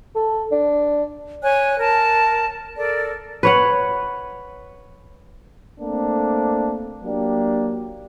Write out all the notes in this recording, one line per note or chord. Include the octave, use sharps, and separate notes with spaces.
A4
D4
C#5 G#5 F#6
A#4 A5
A4 A#4 D5
B4 C#5 F#5
A3 A#3 C4 D4
F#3 A#3 D4 G4